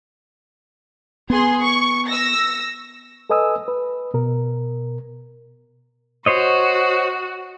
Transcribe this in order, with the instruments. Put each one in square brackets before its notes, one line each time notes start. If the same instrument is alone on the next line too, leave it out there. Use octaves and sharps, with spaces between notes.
[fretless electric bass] B3 [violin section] G#4 C6
[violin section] C#6
E6 A#6
[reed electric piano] A4 B4 D#5 G#5 D#6 E6
B4
B2 A#4
[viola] F#4 [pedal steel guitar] C5 C#5 D#5